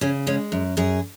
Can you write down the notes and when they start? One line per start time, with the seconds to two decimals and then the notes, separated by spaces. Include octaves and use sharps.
0.01 C#3 C#4
0.27 G#3 C#4
0.52 F#2
0.77 F#2 G#4